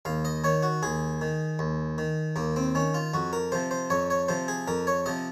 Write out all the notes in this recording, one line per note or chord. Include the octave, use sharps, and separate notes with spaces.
D#2 F5
D#5
D#3 C#5
F#4
D#2 G#4
D#3
D#2
D#3
D#2 A#3
C4
D#3 C#4
F4
F2 F#4
A#4
C3 F3 C5
C5
F2 C#5
C#5
C3 F3 C5
G#4
F2 A#4
C#5
C3 F3 D#5